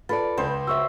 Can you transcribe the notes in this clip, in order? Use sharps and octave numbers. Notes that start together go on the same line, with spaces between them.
F4 A4 B4 D5 A6
C#2 C5
F#4 C#5 E5 C#6 E6